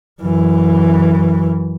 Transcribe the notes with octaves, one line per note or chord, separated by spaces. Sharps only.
F#2 E3